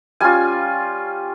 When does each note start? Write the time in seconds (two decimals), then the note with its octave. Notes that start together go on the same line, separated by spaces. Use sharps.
0.20 G3 C#4 F4 G#5